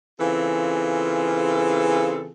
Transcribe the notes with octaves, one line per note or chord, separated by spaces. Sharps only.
C#3 E3 C4 F4 G#4 A4